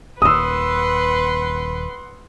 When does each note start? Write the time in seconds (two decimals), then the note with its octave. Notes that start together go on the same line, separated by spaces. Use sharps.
0.22 D#1 D#2 B4 F#5 C6 D#6 E6